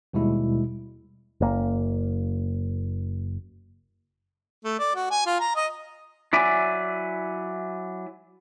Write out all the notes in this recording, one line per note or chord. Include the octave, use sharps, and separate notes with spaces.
D#2 B2 G3 G#3 E4
F#1 A#3
A3
D5
F#4
G#5
F4
A#5
D#5
F#3 E4 D5 E5 G#5